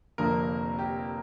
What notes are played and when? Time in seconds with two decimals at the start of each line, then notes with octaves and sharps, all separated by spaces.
0.18 F1 F2 D3 A#3 A#4
0.79 G4